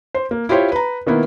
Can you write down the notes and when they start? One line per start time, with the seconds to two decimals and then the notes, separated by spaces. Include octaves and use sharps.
0.15 C5
0.31 A#3
0.49 E4 F4 G4 C5 C#5
0.72 B4 A#5
1.07 D#3 A#3 B3 E4